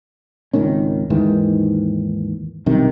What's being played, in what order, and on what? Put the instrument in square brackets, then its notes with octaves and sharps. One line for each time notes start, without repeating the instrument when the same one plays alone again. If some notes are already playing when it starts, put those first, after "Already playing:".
[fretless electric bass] G#1 C#2 D#3 C#4
D#2 G#2 D#3 E3
B1 G2 C3 D#3